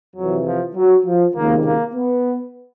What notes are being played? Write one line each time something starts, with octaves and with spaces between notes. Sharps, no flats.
F2 C3 E3 F#3
F3
F#3
F3
C#2 C3 D#3 A#3
A#3
B3